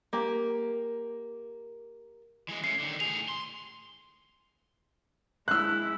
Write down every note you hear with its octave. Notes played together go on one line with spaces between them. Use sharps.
A#3 G4
E3 G#3
A3 C#4 C7
D3 D#3
A2 G#4 F7
C6
G#3 E4 E6 F#6